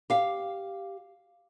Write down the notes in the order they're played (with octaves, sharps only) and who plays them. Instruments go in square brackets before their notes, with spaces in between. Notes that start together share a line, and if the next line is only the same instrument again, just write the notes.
[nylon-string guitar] G4 F5